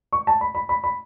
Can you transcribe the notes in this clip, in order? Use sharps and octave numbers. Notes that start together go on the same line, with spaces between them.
C#6
A5
B5
B5
B5
B5